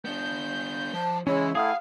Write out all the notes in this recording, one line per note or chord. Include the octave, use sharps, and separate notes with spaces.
B3 D4 G6
F3 A5
C#3 E3 G#3 C#4 E4 C#5
A3 E4 G#4 F5 F#5 D#6 F6